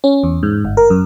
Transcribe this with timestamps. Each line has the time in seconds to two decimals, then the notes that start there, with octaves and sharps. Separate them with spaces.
0.04 C#4
0.24 E2
0.43 G#2
0.65 G1
0.77 A#4
0.90 F#2